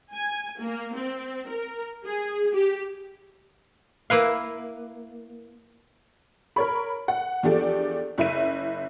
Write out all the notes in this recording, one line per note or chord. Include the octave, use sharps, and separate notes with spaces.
G#5
A#3
C4
A#4
G#4
G4
A#3 E4 B4 F5
A#4 C#5 B5
F#5
E2 F3 D4 G4 A4 D5
F#1 E4 E5 D#7